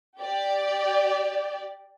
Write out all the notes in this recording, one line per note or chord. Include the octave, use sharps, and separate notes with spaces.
G4 D5